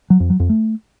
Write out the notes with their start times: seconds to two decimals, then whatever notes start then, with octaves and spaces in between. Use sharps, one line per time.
0.10 F#3
0.20 F2
0.30 F#3
0.40 F2
0.49 A3